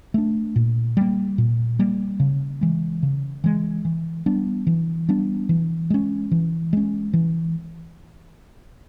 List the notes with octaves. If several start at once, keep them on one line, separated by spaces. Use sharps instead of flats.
A3 D4
A#2
G3 A#3
A#2
G3 A#3
C#3
E3 G#3
C#3
E3 G#3
E3
G3 B3 D4
E3
G3 B3 D4
E3
G#3 C#4
E3
G#3 C#4
E3